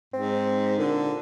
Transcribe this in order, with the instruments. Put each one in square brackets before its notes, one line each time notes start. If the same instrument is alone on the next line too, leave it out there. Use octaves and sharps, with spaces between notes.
[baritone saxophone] G#2 [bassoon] C4
[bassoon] A#2 [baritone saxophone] D3